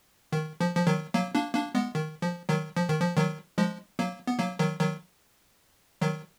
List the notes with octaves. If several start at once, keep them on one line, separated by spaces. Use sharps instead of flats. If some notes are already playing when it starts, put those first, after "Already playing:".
D#3
F3
F3
D#3 F#3
F#3 A#3
A#3 D4
A#3 D4
G#3 B3
D#3
F3
D#3 F#3
F3
D#3
F3
D#3 F#3
F3 G#3
F#3 A#3
B3
F#3 A#3
D#3 F#3
D#3 F#3
D#3 F#3